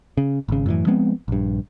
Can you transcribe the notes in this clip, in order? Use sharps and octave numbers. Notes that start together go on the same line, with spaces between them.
C#3
G#1 C#3
F#2 A2 D#3 E3
F3 G#3 B3 C4
A#1 G2